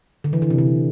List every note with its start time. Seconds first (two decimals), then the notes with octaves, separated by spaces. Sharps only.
0.24 D3
0.33 E3
0.42 D3
0.50 C3
0.58 D3